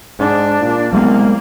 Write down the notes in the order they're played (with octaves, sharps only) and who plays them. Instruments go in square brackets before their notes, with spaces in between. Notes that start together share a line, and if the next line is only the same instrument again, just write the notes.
[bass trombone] G#2 [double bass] D4
[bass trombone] A#2
[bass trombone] C2 [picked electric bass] F#3 G#3 B3 [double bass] A#3